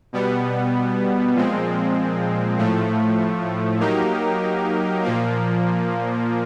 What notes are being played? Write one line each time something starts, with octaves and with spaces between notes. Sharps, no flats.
B2 G3 B3
A#2 F3 G#3 C4
A2 F3 A3
F#3 A#3 D#4 G4 A#4
A#2 F3 A#3